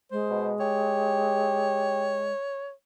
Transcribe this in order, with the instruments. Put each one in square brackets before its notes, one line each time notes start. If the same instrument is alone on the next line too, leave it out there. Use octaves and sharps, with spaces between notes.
[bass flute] G#3 [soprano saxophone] C5
[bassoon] B2
[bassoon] G4 [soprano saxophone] C#5